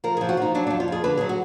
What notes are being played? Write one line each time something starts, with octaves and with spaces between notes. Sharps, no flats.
F3 A#4
G#4
F3
F#4
F3 D#4
F#3 D4
F2 D4
F4
F2 G#4
D3 B4
F#3 G#4
F#4